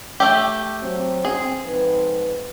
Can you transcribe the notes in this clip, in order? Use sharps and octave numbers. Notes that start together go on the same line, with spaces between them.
A3 G4
F#3 C4
C4 G#4
F2 G#2 B4